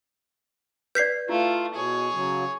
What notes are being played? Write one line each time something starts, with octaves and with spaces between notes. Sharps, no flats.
B4 D5 G6 B6 C7
A3 E4 F4
B2 G#4 C#5
C#3 F#3